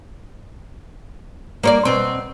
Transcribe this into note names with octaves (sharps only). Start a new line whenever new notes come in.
A#3 C#5 D5
B2 C4